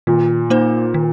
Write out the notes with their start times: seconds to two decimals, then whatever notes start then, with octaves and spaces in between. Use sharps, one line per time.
0.07 A#2 D#3
0.50 A#3 D#4 C5
0.94 D#3